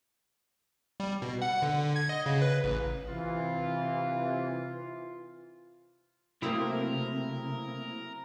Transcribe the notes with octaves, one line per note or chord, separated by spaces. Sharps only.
G3
B2
F#5
D3
G#6
D#5
C#3
B4
A1
C3 E3 F4
C3 F#3 A3 A#3 C4 E4 A#4 D#6